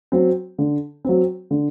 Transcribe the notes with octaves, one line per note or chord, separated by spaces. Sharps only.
F#3 C4
D3
F#3 C4
D3